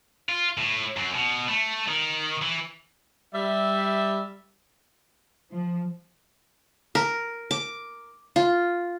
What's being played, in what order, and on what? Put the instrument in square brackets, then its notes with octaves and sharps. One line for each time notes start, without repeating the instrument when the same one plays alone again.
[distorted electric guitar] F4
A2
F#2
B2
A3
D#3
E3
[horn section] G3 E5
[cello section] F3
[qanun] A#4
D6
F4